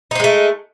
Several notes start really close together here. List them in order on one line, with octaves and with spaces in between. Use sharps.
D#4 C4 G#3 A3